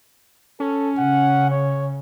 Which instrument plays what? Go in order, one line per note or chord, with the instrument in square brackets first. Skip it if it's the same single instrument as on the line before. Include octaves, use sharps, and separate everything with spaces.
[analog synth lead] C#4 [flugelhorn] A4
[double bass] C#3 [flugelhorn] F#5
[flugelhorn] C#5